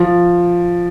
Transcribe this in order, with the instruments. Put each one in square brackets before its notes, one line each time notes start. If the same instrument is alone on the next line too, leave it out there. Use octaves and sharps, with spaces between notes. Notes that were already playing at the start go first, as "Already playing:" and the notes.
Already playing: [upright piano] F3